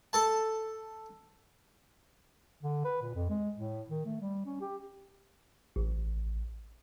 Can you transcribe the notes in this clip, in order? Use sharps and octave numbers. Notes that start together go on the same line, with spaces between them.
A4 A5
D3
B4
A#2
F2
G#3
A2
D#3
A3
G3
C#4
G4
A1